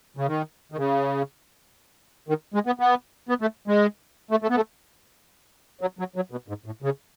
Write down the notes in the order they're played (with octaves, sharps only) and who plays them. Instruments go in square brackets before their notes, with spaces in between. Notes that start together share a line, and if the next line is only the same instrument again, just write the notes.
[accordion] C#3
D#3
D#3
C#3
D#3
G#3
B3
B3
B3
A3
G#3
A3
A3
B3
A3
F#3
F#3
F#3
B2
G#2
A2
C#3